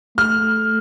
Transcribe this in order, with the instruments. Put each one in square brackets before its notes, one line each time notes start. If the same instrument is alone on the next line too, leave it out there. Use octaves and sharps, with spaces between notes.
[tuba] A3 [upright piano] F6